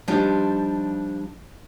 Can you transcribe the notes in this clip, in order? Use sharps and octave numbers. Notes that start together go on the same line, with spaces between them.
F3 G3 D4 D#4 F4 G4